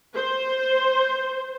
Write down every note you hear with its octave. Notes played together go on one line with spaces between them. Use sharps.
C5